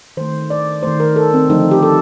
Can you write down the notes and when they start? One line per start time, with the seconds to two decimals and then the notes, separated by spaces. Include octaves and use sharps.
0.17 D#3 A3 C5
0.50 D5
0.83 D#3 A3 C5
1.00 A#4
1.16 A4
1.34 C4
1.49 D3 F3 A3 D#4
1.71 G4
1.83 A4